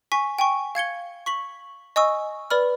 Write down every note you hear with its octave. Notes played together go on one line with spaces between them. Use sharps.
G#5 C#6 B6
G5 G#5 C#6
F5 G#6 C#7 G7
C#6 B6 F#7
D#5 G#5 C#6 D#6 E6
B4 D5 B5 F6